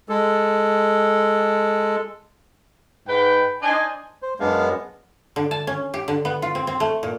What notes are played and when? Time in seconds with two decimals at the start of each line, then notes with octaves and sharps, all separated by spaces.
0.09 G#3 A4
3.08 G#2 B4 G5
3.63 D4 D#4 C5 D#5 G#5
4.22 C5
4.40 F#2 G#3 B3 D4 F5
5.36 D3
5.51 A5
5.67 C#4
5.94 G4
6.08 D3
6.25 B3
6.42 F4
6.55 C4
6.67 C4
6.80 A3
7.03 A#2